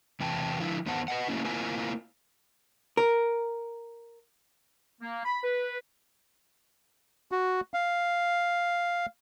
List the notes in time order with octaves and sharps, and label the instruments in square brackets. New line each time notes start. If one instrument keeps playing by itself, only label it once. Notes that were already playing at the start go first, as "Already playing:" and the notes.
[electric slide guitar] E2 C3 E3 G5 A5
D3 F3 E4
E2 D#3 B3 C5 F#5 A5
B4 D#5 F#5
F#3 A3 A#3 C#4 E4
A#3 C4 E4 F4 G#5
[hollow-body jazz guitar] A#4
[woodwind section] A#3
B5
B4
[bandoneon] F#4
F5